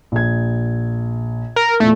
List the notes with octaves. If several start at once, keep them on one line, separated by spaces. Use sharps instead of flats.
A#1 G#6
A#4
E2 A#2 A3